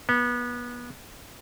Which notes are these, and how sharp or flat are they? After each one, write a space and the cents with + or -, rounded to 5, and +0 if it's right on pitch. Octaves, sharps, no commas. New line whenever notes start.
B3 -25